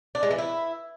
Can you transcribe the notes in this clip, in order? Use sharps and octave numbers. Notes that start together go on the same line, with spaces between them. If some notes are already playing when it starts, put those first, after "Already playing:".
D4
G#3
E3
E4